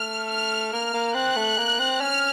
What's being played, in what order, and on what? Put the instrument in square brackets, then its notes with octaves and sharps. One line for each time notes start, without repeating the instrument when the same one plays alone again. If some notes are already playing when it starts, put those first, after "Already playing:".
Already playing: [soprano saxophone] A3 [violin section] F6
[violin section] F6
[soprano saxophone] A#3 [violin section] F6
[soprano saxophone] A#3
[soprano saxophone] C4 [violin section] F#6
[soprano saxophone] A3
A#3
C4
[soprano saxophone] C#4 [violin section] F6